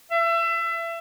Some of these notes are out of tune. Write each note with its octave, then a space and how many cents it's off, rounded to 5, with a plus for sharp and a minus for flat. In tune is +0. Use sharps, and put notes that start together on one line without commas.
E5 +30